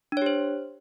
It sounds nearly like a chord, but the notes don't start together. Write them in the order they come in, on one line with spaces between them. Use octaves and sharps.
D4 C#5 G4 C5